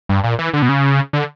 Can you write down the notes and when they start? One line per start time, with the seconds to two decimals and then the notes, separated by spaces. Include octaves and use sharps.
0.09 G2
0.24 A#2
0.39 E3
0.53 D3
0.62 B2
0.69 C#3
1.13 D3